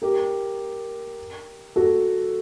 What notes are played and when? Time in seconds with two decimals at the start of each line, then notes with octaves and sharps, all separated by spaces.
0.02 G4 A#4
1.76 F#4 A4